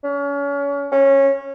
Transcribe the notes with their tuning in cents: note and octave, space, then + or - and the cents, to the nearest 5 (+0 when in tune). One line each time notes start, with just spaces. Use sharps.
C#4 +35
C#4 -15